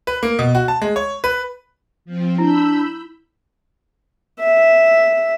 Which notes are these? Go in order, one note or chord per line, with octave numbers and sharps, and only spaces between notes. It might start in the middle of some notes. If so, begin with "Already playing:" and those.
B4
A#3
B2
F#4
A5
G#3
C#5
B4
F3 C4
D4 E4 B5 E6 G6
E5